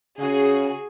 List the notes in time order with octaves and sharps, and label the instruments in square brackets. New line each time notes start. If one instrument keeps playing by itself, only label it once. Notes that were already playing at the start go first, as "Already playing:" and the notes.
[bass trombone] C#3 [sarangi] F#4 [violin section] G#4